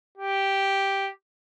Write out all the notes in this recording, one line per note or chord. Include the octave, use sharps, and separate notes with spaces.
G4